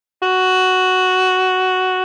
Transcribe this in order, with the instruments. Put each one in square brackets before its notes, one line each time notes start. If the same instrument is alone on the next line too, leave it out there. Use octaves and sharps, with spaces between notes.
[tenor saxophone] F#4